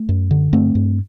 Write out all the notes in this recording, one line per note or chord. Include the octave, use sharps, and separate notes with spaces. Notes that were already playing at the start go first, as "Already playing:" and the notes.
Already playing: A3
F#2
D3
G2 A3 C4
G2